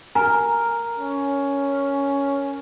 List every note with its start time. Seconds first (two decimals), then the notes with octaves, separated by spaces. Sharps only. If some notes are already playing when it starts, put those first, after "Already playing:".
0.15 A#4 G#5
0.98 C#4